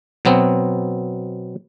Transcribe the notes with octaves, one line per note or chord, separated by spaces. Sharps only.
B2 F#3 B3 C4